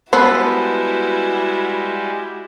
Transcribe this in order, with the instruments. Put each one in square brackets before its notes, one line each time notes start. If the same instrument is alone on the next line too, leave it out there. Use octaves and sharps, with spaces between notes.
[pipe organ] G3 G#3 [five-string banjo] B3 A4 B4 [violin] E4 F#4 [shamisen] C5